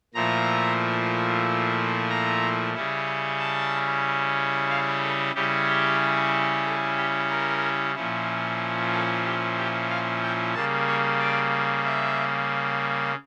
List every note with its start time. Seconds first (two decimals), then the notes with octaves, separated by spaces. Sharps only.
0.14 A#2 F3 A3 E4 A#5
2.09 A#5
2.74 C#3 G3 C#4 E4
3.39 A5
4.70 F5
5.02 A4
5.35 C#3 G3 C#4 E4 G4
5.67 G4
6.65 A4
6.97 G4
7.30 A#4
7.95 A#2 F3 C#4 E4
8.92 A4
9.24 G4
9.57 G4
9.90 F5
10.23 G5
10.55 C#3 G3 A#3 A5
10.87 C#5
11.20 D5
11.85 E5